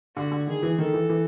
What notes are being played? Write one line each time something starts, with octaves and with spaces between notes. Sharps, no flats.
D3 F#4
D3
D#3 G#4
E3
D#3 A4
E3
E3